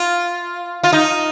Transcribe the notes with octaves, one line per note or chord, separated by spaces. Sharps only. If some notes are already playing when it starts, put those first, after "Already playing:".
Already playing: F4
F4
D#4